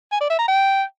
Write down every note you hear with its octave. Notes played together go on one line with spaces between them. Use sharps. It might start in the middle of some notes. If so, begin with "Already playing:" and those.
G#5
D5
E5
A#5
G5